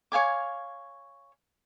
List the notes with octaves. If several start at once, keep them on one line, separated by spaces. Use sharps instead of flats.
C#5 F5 G#5 D6